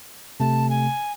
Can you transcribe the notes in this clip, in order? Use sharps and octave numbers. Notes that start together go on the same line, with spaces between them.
C3 A3 A5
G#5